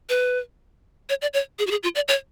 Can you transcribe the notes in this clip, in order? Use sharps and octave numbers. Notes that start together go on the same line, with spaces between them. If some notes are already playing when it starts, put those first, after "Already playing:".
B4
C#5
D5
C#5
G#4
F#4
G#4
F4
D5
C#5